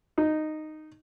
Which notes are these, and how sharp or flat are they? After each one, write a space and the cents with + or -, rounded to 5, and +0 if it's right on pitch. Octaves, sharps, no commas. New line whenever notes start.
D#4 -10